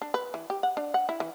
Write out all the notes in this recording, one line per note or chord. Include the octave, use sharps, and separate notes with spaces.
D4
B4
E3
G4
F#5
D4
F#5
E4
E3